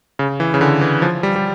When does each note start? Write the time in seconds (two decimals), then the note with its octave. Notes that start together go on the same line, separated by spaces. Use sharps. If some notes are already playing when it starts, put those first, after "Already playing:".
0.19 C#3
0.40 E3
0.54 C#3
0.61 D3
0.81 E3
1.02 F3
1.23 G3
1.36 G3